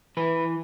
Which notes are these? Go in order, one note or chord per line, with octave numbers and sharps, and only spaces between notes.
E3 B4